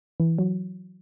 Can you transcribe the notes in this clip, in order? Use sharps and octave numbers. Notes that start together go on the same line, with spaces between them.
E3
F#3